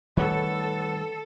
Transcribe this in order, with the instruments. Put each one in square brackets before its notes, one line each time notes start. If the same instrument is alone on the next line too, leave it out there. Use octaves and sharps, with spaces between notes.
[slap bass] D#3 G3 A3 [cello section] A4 [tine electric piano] B4 C#5 F#5